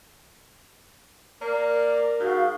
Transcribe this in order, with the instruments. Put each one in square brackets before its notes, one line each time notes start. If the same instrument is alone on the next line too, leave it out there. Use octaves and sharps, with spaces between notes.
[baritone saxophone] A#3 [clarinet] A#4 [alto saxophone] D5
[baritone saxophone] G#2 [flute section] F#4 F5